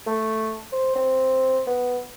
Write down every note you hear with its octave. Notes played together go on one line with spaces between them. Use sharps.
A3
C5
C4
B3